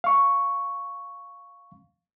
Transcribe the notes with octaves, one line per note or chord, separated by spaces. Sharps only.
F5 C#6